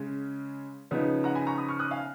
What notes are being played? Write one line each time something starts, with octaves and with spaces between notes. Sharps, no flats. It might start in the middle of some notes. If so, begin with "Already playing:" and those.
Already playing: C#3 G#3 C#4
C#3 F3 B3 D#4
F#5 A#5
G#5 B5
A#5 C#6
B5 D#6
C#6 F6
D#6 F#6
F5 G#5